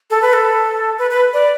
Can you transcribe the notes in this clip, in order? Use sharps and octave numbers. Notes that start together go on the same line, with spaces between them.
A4
B4
A4
B4
B4
D5